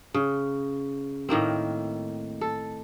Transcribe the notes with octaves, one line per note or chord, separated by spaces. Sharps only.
C#3
A2 D#3 A#3 C4
A4